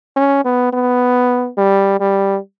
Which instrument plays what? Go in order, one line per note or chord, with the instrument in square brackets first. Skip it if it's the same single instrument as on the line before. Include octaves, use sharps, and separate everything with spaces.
[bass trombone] C#4
B3
B3
G3
G3